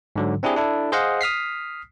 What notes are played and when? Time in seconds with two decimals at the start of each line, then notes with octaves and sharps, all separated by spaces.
0.16 G#2 D3 F#3
0.43 C4 D4 E4 G4 G#4
0.56 D4 E4 A4
0.92 G#4 C5 D#5 F5 F#5
1.21 D#6 F6 B6 C7